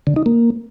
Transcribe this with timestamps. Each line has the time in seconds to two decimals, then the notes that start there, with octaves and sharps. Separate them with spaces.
0.07 D3
0.16 D#4
0.26 A#3